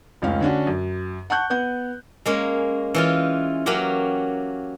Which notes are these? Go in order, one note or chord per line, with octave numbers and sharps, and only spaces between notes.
F1 C#2 C#4 F5
D3 C#4 D4 F#4
F#2
F#5 A5 C#6 F#6 G6
B3 F#5 G6
G#3 A#3 C#4
E3 C#4 F4
F#3 A#3 C#4 F#4 G4